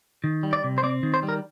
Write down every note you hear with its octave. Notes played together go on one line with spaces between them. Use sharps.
D#3
G3
D5
C3
C5
C4 D5
D#3
C5
G3
A#4